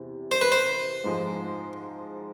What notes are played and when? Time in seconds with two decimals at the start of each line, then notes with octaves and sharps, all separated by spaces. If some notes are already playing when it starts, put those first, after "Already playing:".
Already playing: E2 C3
0.31 C5
0.41 B4
0.52 C5
1.04 G#2 F3 G#3